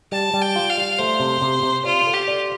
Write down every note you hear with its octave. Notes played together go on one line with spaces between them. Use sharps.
G3 A5
G3
G5
F4
F5
G3
A3 C5
C3
C3
C3
F4 D5
A4
G4
D5